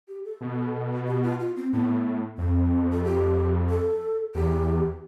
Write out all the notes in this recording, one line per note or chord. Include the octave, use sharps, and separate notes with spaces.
G4
A4
B2
G4
F4
F4
C4
A2 B3
F2 C4
A4
G4
A4
E2 G4